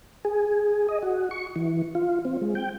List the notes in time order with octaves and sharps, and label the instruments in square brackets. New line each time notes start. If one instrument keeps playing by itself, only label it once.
[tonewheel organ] G#4
D#5
F#4
C#6
E3
F4
C4
G#3
G5